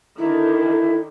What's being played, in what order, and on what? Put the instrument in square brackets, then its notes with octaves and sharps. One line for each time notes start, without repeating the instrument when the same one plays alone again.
[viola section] D3 D#3 [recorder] E4